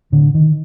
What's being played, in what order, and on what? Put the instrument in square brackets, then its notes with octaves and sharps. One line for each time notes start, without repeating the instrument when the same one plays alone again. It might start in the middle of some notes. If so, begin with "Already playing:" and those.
[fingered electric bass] A2 D3
D#3